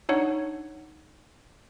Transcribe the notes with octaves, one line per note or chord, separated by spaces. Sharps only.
D4 D#4 C#5 F#5